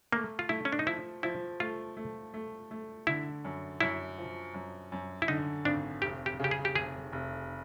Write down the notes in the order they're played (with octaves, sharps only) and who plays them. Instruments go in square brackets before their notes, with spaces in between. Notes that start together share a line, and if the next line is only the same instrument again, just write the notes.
[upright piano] A3 [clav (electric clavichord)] A#3
[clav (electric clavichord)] F4
[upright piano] A3 [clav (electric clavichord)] E4
[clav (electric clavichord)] C#4
D4
D#4
[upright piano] F3 [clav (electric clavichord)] E4
[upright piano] F3 [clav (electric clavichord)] E4
[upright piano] A3 [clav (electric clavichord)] F4
[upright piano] A3
A3
A3
[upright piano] D3 [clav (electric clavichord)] E4
[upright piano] F#2
[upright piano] F#2 [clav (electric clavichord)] E4
[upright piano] F3
F#2
F#2
[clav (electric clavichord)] E4
[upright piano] D3 [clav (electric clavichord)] D#4
[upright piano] G#1 [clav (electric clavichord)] D4
[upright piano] F1 [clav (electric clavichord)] G4
[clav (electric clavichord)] G4
[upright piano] C#3 [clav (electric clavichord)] G4
[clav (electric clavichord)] G#4
G4
[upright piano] F1 [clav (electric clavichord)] G#4
[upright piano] F1